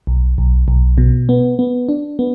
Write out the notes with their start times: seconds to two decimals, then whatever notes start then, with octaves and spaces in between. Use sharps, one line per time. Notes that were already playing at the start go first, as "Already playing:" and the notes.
0.07 B1
0.38 B1
0.68 B1
0.98 B2
1.29 B3
1.59 B3
1.89 D4
2.19 B3